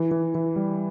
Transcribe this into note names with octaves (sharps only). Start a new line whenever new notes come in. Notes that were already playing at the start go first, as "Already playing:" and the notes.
Already playing: E3
E3
E3
G3